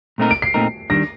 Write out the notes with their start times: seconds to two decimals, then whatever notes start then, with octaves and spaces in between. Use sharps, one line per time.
0.18 A#2 A3 C4 D#4 A#4
0.31 D7
0.42 C7
0.54 A#2 A3 C4 D#4 A#4
0.90 D#3 G3 D4 A#6